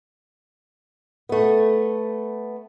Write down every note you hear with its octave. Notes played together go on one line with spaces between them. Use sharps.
A3 B3